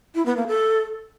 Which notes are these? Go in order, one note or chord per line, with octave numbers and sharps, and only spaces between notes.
E4
B3
A#3
A4